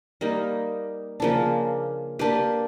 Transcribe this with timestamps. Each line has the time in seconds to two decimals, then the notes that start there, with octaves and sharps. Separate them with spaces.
0.21 G3 A#3 D#4
1.20 C#3 F3 A#3 D4
2.19 A#3 D4 G4 B4